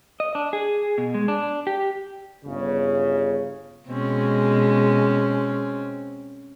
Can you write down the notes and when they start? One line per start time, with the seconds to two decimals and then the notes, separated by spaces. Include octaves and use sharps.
0.20 D#5
0.35 D4
0.53 G#4
0.98 B2
1.14 G#3
1.28 D4
1.67 G4
2.45 G1 C#3
3.89 B2 G#3 C4 C#4